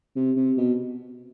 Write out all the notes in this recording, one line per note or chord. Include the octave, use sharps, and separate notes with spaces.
C3
C3
B2